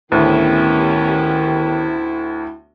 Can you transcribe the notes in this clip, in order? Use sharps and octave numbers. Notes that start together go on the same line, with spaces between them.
D2 A2 D#3 B3 C#4 E4 G4